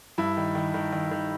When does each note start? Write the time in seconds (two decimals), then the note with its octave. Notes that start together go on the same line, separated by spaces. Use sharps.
0.18 G2 E4
0.37 D#3
0.55 D#3
0.74 D#3
0.92 D#3
1.11 D#3